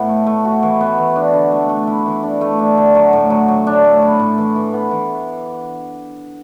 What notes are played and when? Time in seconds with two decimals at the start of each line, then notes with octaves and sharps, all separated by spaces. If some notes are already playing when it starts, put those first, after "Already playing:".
Already playing: A2 B3 E4
0.09 A3
0.27 A3
0.45 F#4
0.63 E3
0.81 B3
0.98 E3
1.16 D4
1.34 D3
1.52 A3
1.69 A3
1.87 E4
2.06 E3
2.23 D4
2.41 A3
2.59 D4
2.77 D3
2.95 F#3
3.13 A2
3.30 F#3
3.48 F#3
3.67 D4
3.84 A3
4.02 E4
4.19 A2
4.38 E3
4.56 E3
4.73 B3
4.91 E3